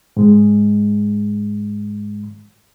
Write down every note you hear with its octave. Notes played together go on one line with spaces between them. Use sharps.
G#2 G#3